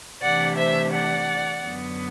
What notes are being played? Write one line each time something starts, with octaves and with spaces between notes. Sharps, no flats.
C3 E3 A3 D4 D5 F#5
C5 E5
D5 F#5
F#2 D3 F#3 B3